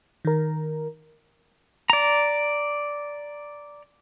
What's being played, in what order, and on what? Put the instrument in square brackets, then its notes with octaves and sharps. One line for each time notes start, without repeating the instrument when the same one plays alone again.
[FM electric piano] D#3 A#4
[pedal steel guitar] D5 A#5